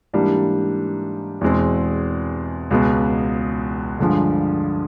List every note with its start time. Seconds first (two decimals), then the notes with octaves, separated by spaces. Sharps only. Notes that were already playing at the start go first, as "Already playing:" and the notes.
0.13 G#2 E3 G3 A#3 D4
1.41 E2 B2 G#3 C4
2.71 C#2 B2 G#3 B3
3.99 G2 D3 F3 G#3